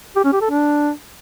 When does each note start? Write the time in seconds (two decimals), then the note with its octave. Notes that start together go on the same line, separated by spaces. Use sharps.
0.16 G4
0.24 C#4
0.33 G4
0.41 A4
0.50 D4